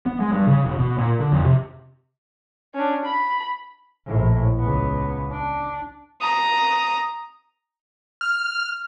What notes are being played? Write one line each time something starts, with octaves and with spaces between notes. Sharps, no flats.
B3
G#3
G2
C#3
E1
B2
A#2
D3
F2
C3
C#4 D4
B5
A#1 A2
C#2 B3
D4
A#5 D#6
F6